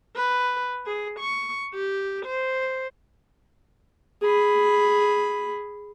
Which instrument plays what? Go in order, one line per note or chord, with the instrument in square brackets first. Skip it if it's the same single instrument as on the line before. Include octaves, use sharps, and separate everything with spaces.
[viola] B4
G#4
C#6
G4
C5
[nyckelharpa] G#4 B5